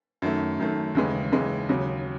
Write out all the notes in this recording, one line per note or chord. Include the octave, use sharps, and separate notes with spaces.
F#2 D#3 A3
F#2 D#3 A3
D#2 C#3 E3 G#3
D#2 C#3 E3 G#3
D#2 C#3 F#3